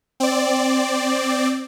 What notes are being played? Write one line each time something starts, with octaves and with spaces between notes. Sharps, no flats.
C4 D5